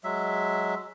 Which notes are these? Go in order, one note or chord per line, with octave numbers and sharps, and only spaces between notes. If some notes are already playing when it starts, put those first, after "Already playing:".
F#3 G#3 E5